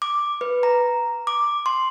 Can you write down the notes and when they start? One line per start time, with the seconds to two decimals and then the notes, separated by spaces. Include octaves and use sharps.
0.02 D6
0.41 B4
0.63 A#5
1.27 D6
1.66 C6